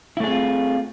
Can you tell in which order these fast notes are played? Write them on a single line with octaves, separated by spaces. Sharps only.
E4 A3 G#4 C4 F4